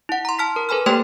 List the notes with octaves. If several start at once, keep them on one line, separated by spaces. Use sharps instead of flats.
E4 F#5
A#5 C6
A5 F6 B6
A#4
A4 B4 G#5 B5 F6
A3 A#3 G4 C5 G5 C6